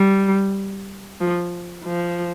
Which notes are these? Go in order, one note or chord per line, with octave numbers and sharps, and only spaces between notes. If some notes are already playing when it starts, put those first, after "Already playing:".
Already playing: G3
F3
F3